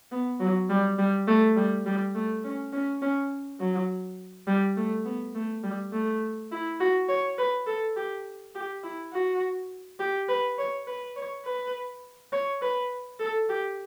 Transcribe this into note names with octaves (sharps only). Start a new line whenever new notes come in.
B3
F#3
G3
G3
A3
G3
G3
A3
C#4
C#4
C#4
F#3
G3
A3
B3
A3
G3
A3
E4
F#4
C#5
B4
A4
G4
G4
E4
F#4
G4
B4
C#5
B4
C#5
B4
C#5
B4
A4
G4